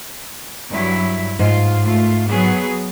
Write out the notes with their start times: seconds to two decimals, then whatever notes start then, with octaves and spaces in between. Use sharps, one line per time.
0.70 G2 F#3 E4
1.39 G#2 F4
1.84 A3 F4
2.28 F#3 B3 G#4